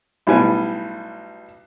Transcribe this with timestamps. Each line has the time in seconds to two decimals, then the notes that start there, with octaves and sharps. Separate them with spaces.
0.27 B1 A2 G3 G#5